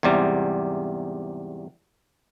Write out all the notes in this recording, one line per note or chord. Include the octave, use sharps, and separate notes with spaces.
E2 G#2 C3 G3